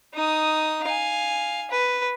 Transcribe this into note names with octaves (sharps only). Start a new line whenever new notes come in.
D#4 D#6
F5 G#5
B4